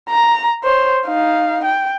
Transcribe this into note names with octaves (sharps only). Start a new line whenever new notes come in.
A#5
C5 C#5
D#4 F5
G5